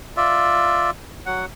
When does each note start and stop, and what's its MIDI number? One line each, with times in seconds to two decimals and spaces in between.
0.17 0.91 65
0.17 0.91 74
0.17 0.91 76
1.26 1.46 54
1.26 1.46 78